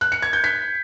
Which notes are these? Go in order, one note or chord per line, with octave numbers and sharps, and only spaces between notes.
F#6
C#7
G#6
G6
B6